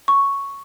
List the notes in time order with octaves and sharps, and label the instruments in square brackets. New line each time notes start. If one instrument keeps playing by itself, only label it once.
[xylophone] C#6